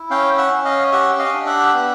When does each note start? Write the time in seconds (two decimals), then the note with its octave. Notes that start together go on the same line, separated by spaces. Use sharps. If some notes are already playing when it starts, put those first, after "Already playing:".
Already playing: E4
0.10 C#4 F5 G5
0.37 E5 F#5
0.52 C#4
0.65 D#5 F5
0.92 G4 E5 F#5
1.19 D#5 F5
1.34 D4
1.46 E5 F#5
1.74 B3